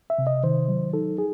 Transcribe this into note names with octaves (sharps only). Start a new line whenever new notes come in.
E5
C3
D#5
D#3 C5
F#3
D#4 A4
G#4